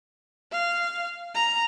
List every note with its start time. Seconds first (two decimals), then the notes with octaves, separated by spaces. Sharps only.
0.52 F5
1.34 A#5